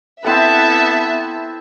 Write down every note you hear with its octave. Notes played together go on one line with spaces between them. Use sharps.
B3 C4 E4 A4 E5 A5